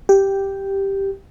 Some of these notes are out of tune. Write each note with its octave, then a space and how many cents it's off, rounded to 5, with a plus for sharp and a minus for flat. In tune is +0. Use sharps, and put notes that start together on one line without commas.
G4 +0